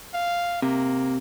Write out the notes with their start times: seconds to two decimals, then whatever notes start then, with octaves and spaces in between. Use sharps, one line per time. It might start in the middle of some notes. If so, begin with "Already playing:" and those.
0.14 F5
0.62 C3 A#3